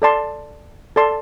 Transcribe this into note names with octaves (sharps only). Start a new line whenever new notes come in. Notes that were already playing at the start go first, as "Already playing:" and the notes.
A4 D5 A5 C6
A4 D5 A5 C6